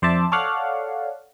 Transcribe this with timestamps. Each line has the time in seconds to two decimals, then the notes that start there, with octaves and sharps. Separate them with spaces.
0.02 F2 C5 D5 E5 A5
0.32 A4 C#5 D5 F5 F#5